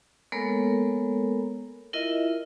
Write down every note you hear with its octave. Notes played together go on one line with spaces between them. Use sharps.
G#3 A#3 B3 A4 A#4 C#5
E4 F4 A#4 D#5 E5